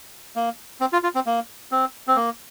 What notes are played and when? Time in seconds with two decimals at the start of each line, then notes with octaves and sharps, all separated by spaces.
0.36 A#3
0.81 C4
0.93 F4
1.03 F4
1.15 C4
1.26 A#3
1.72 C4
2.07 C4
2.16 A#3